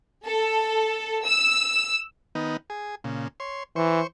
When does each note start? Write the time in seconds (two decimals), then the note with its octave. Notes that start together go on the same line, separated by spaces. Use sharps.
0.25 A4
1.25 E6
2.35 D#3 B3 D#4
2.70 G#4
3.04 A#2 C#3
3.40 C#5 C6
3.76 E3 C5 C#6